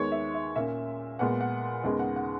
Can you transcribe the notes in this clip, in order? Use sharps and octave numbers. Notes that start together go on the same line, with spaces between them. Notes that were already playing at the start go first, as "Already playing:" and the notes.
Already playing: D#2 D#3 G#3 B3 C#5
E5
E5
A#2 A#3 C#4 E5
A#2 G#3 B3 F#5
F#5
D#2 C#3 G#3 B3
F#5
F#5